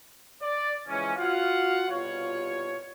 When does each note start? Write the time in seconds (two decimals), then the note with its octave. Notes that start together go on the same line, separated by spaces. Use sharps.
0.41 D5
0.88 C#3 E3 F3 G#3 C#4
1.17 F4 F#4 F5 F#5
1.89 C2 B2 G3 F4 C#5